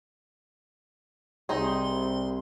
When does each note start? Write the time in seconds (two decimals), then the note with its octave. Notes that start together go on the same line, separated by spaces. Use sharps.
1.49 C2 C4 D#4 G#4 C6